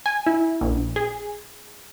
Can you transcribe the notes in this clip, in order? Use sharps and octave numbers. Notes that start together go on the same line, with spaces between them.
G#5
E4
A#1
G#4